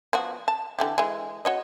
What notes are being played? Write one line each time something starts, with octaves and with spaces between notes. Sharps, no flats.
F3 B3 F#4
A5
D3 E3 G4
E3 G#3
F#4 C#5 D#5